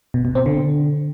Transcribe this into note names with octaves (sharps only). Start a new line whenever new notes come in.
B2
B2
C4
D3